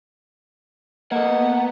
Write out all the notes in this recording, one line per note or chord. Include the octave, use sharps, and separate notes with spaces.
A#3 B3 A4 D#5 F#5